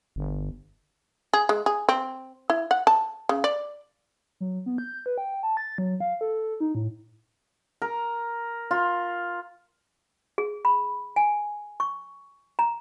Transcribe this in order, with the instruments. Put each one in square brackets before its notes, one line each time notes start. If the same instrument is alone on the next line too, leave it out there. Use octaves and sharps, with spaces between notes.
[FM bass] G1
[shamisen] G#4
G#3
G#4
C4
E4
F#5
A5
C#3
D5
[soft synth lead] F#3
B3
G6
B4
G5
A5
A6
F#3
F5
A4
D#4
A2
[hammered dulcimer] A#4
F4
[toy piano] G#4
B5
G#5
C#6
A#5